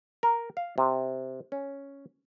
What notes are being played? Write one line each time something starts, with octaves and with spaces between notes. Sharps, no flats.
A#4
F5
C3
C#4